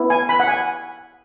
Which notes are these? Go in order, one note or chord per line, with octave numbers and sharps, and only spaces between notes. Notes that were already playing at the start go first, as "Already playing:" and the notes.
Already playing: B3 E4
G#5
B5
F#5
G#5